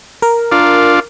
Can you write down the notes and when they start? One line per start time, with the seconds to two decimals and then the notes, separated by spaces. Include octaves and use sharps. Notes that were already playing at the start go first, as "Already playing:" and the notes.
0.22 A#4
0.52 D4 F4